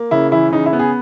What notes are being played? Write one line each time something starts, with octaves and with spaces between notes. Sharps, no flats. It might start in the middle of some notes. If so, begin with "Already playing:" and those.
Already playing: A#3
C#3 E4
E3 E4
C#3 D#4
E4
B3
G#4